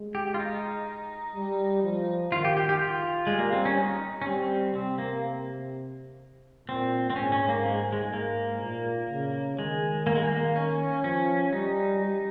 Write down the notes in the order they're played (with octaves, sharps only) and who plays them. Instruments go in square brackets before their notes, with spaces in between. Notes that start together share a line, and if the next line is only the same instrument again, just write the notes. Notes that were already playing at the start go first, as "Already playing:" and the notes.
Already playing: [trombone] G#3
[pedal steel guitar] G4
F4
D#4
[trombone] G3
F3
[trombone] D#3 [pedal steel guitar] F4
[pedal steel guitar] G4
G4
G4
F4
[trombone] G3 [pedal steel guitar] G#3
[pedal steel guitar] A#3
C4
C#4
D#4
C#4
[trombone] G3 [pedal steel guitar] C4
[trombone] C3 [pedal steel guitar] C4
[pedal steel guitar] A#3
[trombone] A#2 [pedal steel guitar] C4
[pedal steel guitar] C4
[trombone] G#2 [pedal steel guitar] C#4
[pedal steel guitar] C#4
A#3
G#3
G#3
[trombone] G#2 [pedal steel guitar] A#3
[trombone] A#2
C#3
[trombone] D#3 [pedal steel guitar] G#3
[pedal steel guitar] A#3
G#3
A#3
C#4
[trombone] F3 [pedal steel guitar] C#4
[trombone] G3 [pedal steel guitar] D#4
[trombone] G3